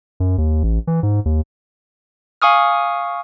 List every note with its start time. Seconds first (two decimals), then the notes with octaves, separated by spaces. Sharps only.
0.20 F#2
0.38 D#2
0.63 A1
0.87 E3
1.03 G#2
1.25 D#2
2.42 F5 G#5 C#6 D#6 F6